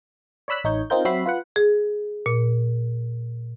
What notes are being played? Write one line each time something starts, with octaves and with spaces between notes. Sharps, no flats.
C#5 D5 B5 E6 F#6 B6
A1 D#4 C#5 G6
C4 D#4 F4 A#4 G6
F#3 C4 F#4 E5 B5 C7
F4 B4 F#5
G#4
A#2